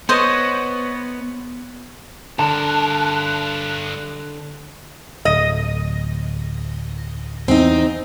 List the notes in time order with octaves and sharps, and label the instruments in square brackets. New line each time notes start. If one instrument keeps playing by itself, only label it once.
[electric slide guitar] B3 [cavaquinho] C5 C#5 D#5
[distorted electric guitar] G2 A#4 [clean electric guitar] D3 [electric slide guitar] A5 [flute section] F#6
[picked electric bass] D1 [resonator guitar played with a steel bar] D#5
[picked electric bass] E2 [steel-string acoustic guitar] C4 D#4